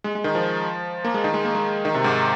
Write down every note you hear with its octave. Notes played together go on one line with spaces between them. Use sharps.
G#3
G#3
D#3
F3
A#3
G#3
D#3
G#3
A#3
G#3
D#3
C3
G#2